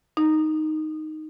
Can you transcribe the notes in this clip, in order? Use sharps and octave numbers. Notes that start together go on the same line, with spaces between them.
D#4